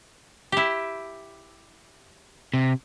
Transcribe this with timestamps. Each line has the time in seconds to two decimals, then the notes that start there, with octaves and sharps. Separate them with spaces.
0.52 E4 G4
2.54 C3